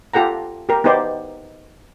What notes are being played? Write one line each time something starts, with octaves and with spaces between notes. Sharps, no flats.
F4 G4 A4 F#5 A#5
G4 A#4
B3 D#4 G4 C5 D5